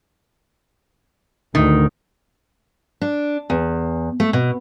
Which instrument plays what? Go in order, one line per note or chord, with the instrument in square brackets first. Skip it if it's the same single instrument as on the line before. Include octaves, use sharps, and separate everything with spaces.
[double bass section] D2 A2 [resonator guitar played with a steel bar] D#3
[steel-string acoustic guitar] D4
E2
A3
B2